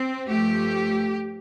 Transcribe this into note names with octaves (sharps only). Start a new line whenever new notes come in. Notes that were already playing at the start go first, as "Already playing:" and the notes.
Already playing: C4
G2 F3 A3 G4